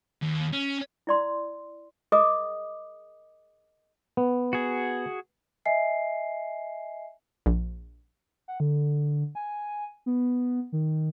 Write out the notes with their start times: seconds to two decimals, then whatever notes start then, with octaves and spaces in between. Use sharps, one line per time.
0.22 D#2
0.52 C#4
1.07 E4 D5 C6
2.12 G#4 A#4 D#5 D6 D#6
4.17 B3
4.53 F#4 G#4
5.66 D#5 E5 G#5 C7
7.46 A#1
8.48 F#5
8.60 D3
9.35 G#5
10.06 B3
10.72 D#3